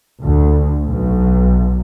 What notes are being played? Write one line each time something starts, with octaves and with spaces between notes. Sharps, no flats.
D2
B1